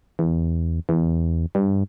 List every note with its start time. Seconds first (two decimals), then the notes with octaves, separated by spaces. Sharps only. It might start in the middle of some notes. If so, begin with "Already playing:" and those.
0.19 E2
0.89 E2
1.55 G2